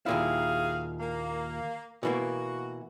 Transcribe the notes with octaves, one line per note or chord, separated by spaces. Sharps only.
D#2 A#2 E4 F#4 G#4 F5
A#3
B2 E3 A#3 F#4